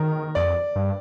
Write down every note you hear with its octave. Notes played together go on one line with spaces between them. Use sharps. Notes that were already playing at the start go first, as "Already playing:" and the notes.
Already playing: D#3 A#4
F2 D5
G2